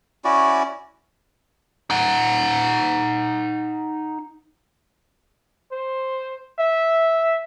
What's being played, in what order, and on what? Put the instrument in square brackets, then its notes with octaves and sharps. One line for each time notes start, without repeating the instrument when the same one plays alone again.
[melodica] C#4 E4 F#4 D5
[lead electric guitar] D#4 F#5
[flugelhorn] C5
E5